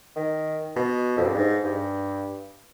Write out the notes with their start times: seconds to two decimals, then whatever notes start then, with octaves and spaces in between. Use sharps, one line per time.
0.16 D#3
0.76 B2
1.18 F2
1.26 G2
1.36 G#2
1.64 G2